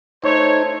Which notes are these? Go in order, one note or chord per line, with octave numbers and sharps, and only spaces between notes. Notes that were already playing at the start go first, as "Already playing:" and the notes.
A3 D#4 C5 C#5